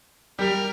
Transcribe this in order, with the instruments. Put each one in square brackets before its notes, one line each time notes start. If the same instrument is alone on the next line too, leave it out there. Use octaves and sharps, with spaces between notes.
[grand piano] G3 G4 [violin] A#4